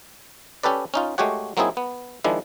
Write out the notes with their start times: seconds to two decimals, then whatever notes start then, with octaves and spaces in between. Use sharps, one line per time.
0.63 C#4 G4 A4 B4 D5
0.94 C#4 D#4 F4
1.18 G#3 A3 F#4 G4 C#5 F#5
1.57 F#3 A#3 C4 D#4 E4 G#4
1.77 B3
2.24 D#3 F3 G#3 D4 E4